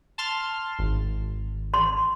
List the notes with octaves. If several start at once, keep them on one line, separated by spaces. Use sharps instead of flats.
A5 C6 F6
G#1
C6